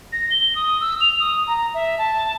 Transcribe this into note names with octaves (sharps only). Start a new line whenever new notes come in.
A#6
G7
D#6
E6
F7
D#6
A#5
E5
A5